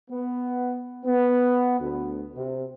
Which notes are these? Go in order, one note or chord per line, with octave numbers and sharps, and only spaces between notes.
B3
B3
D2
C3